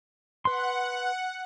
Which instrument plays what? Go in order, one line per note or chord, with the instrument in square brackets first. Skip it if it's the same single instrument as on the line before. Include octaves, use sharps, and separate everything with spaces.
[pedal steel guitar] B4 C6 [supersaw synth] F#5